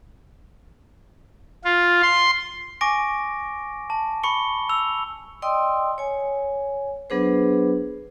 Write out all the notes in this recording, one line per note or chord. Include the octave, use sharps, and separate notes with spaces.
F4
C6
G#5 C#6 D6 A#6 D7
A5
B5 C#6 C#7 G7
E6 F7
D5 D#5 G5 C6 D#6 E6
C#5 G#5
F#3 B3 D4 G#4 B4 C5